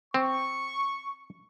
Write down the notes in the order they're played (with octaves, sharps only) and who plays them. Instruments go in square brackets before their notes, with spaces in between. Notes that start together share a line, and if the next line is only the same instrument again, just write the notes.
[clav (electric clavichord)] C4 [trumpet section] C#6